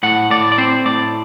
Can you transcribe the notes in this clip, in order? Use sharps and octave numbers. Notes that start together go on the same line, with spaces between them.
A2 F#5
A2 D5
D5
C4 C5
A2 D5